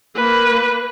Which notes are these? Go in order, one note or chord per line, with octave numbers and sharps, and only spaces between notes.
A#3 B4